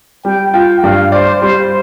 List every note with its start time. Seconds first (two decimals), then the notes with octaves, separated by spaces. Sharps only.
0.25 G3 G5
0.54 F4 G5
0.83 G2 F5
1.12 C5 D5
1.41 G3 C5